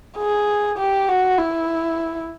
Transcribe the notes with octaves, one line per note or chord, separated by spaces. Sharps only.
G#4
G4
F#4
E4